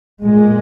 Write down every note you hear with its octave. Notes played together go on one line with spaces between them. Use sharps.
A#2 G#3